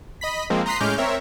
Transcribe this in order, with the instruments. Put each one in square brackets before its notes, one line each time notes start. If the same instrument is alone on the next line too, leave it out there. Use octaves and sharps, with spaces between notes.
[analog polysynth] D#5 B5 B6
F3 G#3 A#3 C4
A#5 C6 D#6 F#6 B6 C7
A2 G#3 C#4 D6 F6 G6
C4 A#4 C#5 E5